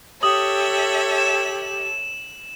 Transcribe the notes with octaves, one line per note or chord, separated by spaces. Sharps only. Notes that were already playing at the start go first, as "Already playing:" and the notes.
G4 A4 C#5 E5 D#6 F#7
E7